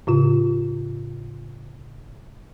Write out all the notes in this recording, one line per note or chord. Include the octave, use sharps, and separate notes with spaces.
A2 C#3 F4